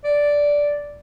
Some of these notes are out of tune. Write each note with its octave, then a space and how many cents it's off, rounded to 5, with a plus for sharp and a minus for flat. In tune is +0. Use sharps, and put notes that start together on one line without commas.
D5 -5